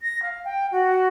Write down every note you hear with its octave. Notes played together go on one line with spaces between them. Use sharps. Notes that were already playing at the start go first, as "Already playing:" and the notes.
A#6
F5
G5
F#4